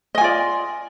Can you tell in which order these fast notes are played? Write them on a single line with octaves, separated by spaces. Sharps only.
D#5 G#5 F4 D5